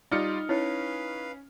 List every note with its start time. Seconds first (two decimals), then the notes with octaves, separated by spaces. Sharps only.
0.11 G3 D#4 F4 D5 F6 C#7
0.49 C#4 E4 B4 C#5 F5